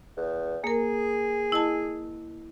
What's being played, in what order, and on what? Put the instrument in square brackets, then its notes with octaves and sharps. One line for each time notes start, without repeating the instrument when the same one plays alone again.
[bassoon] E2
[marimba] A#3 A#4 [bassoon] G#4
[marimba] E4 D#5 A5